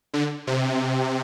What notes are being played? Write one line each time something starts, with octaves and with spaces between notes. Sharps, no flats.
D3
C3